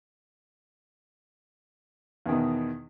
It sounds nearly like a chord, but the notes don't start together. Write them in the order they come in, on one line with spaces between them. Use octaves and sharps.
E2 D#3 B2